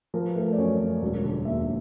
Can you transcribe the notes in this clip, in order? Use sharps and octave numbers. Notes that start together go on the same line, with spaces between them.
F3 A#4
B4
A3 A#4
D5
F#2 C#5
F#2
E1
D3
D#2 E5